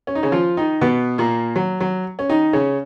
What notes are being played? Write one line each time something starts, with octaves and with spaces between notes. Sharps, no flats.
C#4
D#4
C#3 C#4
F3 F4
D#3 D#4
B2 B3
A#2 A#3
F#3
F#3
C#4
D#3 D#4
C#3 C#4